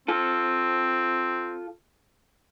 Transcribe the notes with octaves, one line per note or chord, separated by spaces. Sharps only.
C4 F4 A4